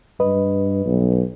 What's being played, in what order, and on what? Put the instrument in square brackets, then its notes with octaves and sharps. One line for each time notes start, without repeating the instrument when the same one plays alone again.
[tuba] G2 [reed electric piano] B4 D#5
[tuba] B1